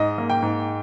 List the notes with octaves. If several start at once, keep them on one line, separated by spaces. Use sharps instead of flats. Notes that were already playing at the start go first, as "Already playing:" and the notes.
Already playing: G#2 D#5
A#3
G5
G#2